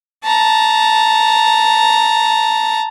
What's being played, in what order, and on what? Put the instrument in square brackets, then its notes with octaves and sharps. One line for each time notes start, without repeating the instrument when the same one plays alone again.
[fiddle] A5 A#5